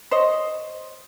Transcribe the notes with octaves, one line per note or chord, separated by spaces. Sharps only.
C5 C#5 D#5